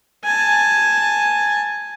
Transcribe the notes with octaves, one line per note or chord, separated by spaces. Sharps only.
G#5 A5